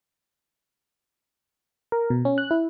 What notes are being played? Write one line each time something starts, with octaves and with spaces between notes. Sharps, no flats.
A#4
B2
C#4
F#6
E4